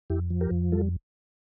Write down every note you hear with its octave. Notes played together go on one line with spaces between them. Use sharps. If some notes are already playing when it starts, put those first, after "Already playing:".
F2 E4 G4
F3
G4 A#4
F2
G3 F4 A4